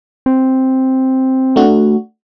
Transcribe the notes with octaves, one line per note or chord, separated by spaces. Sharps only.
C4
A3 D4 F#4